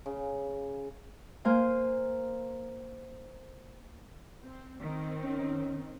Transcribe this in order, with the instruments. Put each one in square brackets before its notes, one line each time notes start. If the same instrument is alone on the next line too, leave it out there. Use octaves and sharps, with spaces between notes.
[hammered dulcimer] C#3
[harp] A#3 C5 G#5
[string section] C4
D#3 C4
[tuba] C#4